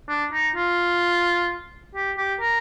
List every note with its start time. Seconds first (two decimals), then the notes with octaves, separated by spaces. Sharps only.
0.08 D4
0.32 D#4
0.55 F4
1.95 G4
2.17 G4
2.40 A#4